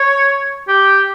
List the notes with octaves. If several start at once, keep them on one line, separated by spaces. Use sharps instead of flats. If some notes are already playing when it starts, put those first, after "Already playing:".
Already playing: C#5
G4